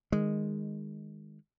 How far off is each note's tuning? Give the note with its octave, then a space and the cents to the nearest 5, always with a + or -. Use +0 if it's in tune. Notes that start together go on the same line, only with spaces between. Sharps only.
D#3 +0 G#3 -10